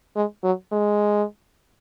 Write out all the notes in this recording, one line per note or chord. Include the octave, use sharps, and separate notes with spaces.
G#3
F#3
G#3